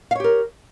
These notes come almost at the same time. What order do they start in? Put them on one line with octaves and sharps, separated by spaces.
F5 C#5 G4 A#4